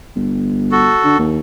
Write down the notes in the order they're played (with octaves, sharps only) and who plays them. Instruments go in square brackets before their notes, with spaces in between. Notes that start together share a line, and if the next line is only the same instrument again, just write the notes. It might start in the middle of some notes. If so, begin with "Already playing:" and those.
[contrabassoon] G1
[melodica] F#4 A4
[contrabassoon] D3
D#2